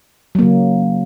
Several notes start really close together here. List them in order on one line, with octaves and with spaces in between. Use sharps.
F#3 A#3 C#3